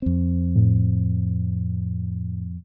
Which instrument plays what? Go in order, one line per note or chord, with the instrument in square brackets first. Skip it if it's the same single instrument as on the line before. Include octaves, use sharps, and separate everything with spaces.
[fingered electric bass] F2 C4
[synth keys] A2